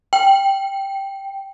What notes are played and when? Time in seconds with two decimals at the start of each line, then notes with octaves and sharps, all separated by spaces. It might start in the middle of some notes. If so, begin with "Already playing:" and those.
0.13 G5